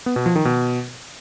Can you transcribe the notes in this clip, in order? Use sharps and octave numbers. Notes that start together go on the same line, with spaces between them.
B3
B2
F3
D#3
B2